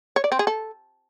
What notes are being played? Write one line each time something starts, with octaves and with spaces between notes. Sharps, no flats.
C#5
D5
C4
G#4
A4